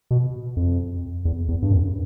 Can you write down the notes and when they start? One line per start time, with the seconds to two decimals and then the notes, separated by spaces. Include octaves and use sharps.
0.11 B2
0.57 F2
1.25 E2
1.48 E2
1.62 G2
1.71 F#2